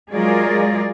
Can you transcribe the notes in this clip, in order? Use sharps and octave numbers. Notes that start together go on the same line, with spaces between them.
F#3 G#3 F4 G#4 A#4 D5